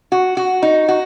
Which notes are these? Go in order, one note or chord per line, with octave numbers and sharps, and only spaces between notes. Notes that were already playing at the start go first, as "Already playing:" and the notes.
F#4
F#4
D#4
F#4